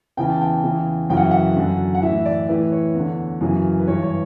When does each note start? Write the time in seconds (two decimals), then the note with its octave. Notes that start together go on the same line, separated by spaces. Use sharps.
0.17 E2 C#3 E3 G5
0.30 A5
0.41 G5
0.64 E2 C#3 E3
1.10 F#2 C#3 E3 G5
1.17 F#5
1.24 E5
1.31 F#5
1.56 F#2 D3
1.95 F#5
2.02 A2 E3 E5
2.26 D5
2.49 A2 E3 B4
2.72 C#5
2.95 E2 D3
3.41 F#2 C#3 E3
3.79 B4
3.87 G2 E3 C#5
4.03 C#5